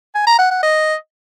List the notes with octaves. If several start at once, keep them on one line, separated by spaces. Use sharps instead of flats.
G#5
A#5
F#5
F#5
D#5